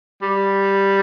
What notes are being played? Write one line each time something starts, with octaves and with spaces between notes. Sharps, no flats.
G3